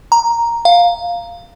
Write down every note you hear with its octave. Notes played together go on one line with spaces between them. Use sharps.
A#5
F5